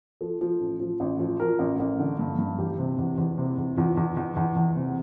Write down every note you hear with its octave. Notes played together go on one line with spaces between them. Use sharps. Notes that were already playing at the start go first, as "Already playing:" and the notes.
F3 A4
F3
A1
F3
A1
F3
F3 A#4
A1
A1
D3
G2
G2
E2 G4
C3
E2
E2
C3
E2
E2 F4
E2
E2
E2
E2
C3